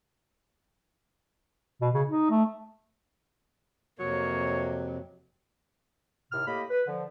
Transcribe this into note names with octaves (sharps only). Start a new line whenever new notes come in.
B2
C#3
D#4
A3
F2 C3 F#3 A#3 C#5
D#2 A2 C3 F6
A2 A#3 G4 D#5 B5
B4
D3 F3